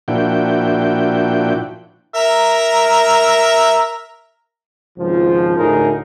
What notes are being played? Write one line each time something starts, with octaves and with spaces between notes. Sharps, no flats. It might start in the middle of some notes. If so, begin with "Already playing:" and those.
A#2 F3 D4 E4 F#4 G5
A#4 E5 A#5
G#1 C#2 F3
D2 A2 D#4 G#4 A#4